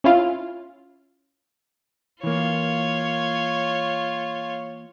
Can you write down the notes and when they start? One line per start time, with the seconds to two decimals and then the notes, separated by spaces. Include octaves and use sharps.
0.04 C#4 E4 F4
2.23 E3 A#3 F4 C#5